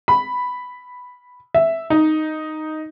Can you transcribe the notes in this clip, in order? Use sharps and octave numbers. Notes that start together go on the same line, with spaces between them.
B5
E5
D#4